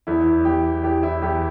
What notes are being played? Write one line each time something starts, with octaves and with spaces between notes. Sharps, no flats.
E2 E4
E2 G4
E2 G4
E4
E2 G4